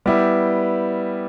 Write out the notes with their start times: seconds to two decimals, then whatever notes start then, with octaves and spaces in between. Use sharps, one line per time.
0.06 G3 B3 E4 G4